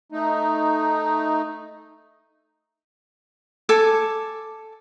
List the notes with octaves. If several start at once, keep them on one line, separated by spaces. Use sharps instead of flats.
A3 D#4
A4 G#5 D6